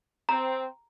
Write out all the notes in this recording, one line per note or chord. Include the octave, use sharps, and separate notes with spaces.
C4 A#5